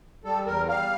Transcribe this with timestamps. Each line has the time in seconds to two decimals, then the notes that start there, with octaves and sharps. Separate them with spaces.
0.25 G3 A4
0.46 E2 A#4
0.68 G3 F5